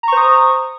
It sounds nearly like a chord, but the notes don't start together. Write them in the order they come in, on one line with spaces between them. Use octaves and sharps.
A#5 C#6 C5 D#6